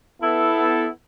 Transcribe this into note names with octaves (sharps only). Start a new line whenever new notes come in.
B3 E4 A4